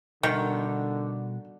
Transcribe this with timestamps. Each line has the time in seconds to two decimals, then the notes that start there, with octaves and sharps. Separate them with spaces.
0.23 B2 D3 D#3 G3 F#4